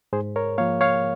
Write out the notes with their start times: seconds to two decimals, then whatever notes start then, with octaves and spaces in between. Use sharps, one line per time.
0.13 G#2 G#4 C5
0.36 A#4 C#5
0.58 F3 A#3 C#5 F5
0.81 C#5 F5